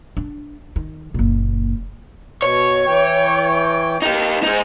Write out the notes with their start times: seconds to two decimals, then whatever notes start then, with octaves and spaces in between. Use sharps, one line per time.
0.17 D4
0.76 D#3
1.14 F#1 A#2
2.42 B2 C#5
2.87 E3 G5
4.02 D#4 G4
4.43 D#4 G#4